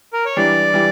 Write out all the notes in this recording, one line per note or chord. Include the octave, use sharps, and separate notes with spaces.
A#4
C#5
E3 G3 D4 D5
E3 G3